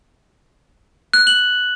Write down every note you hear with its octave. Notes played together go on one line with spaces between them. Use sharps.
F#6
F#7